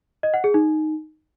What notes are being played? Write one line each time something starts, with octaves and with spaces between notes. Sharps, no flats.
D#5
F#5
G#4
D#4